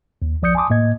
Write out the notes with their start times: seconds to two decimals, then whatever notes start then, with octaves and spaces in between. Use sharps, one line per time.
0.22 D#2
0.42 B1 F3 D5 D#6 G6 C#7
0.55 G#5 A5 C6 D6 D#6
0.70 A2 A#3 D#5 G#6